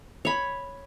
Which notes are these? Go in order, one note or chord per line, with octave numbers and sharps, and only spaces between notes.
C#5 B5